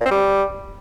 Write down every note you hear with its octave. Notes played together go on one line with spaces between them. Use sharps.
A#2
C4
G3